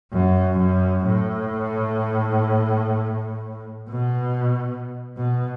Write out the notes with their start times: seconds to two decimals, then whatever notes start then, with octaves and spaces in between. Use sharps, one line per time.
0.12 F#2
0.59 F#2
1.06 A2
3.90 B2
5.17 B2